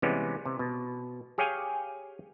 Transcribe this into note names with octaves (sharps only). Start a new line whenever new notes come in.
C3 E3 G3 G#3 B3 C#4
C3
B2
G4 G#4 C#5 F5 G5 G#5